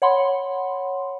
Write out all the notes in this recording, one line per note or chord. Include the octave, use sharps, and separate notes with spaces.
C#5 F#5 B5 C6